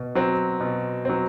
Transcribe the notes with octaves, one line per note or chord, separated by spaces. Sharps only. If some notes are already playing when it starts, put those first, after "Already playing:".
Already playing: B2
F#3 C4
B2
F#3 C4